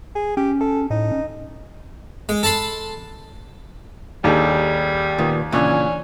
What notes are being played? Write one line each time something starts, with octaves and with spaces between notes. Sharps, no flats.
G#4
C#4 G4
A4
A2 D#4
C#4
G#3
A4 A5 B5 C6
D#2 G3 D4 G#4 A4
A#2 D#3 B3
A#2 C#3 E3 C#4 D4